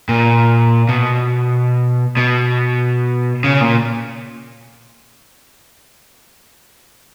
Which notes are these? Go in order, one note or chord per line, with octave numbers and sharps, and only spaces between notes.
A#2
B2
B2
C#3
A#2